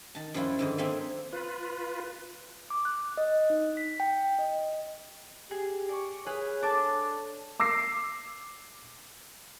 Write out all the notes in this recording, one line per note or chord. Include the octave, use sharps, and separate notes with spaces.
D#3 A5
F#2 F3 G3 E4 F4
G#2 D3 D#3
A#3 C4 A4 E5 F5 G#5
F4 B4
D6
F#6
D#5
D#4
B6
G5
D#5
G4 G#4
D5 C#6
G#4 B4 C#5 F5
D4 A4 A5 D6
D6 E6 A#6 C7